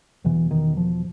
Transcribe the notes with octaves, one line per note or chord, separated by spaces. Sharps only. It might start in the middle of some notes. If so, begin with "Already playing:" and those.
E2 B2 E3
D#3
F3